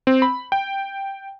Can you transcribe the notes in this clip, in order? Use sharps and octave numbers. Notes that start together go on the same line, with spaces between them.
C4
B5
G5